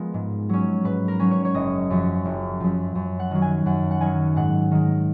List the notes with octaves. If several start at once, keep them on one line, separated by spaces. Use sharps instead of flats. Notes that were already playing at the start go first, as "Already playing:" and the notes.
Already playing: F3 G#3 B3 A#4
G#2
F#3 C#4
G#2 B4
A#4
F#3 C#4
C#5
C#5
F#1 D#5
F#2 F3
F#1
F#2 F3
F#2
F#5
D#3 F#3
G#5
F#2 F#5
F#5
D#3 F#3 G#5
G#2 F#5
D#3 G#3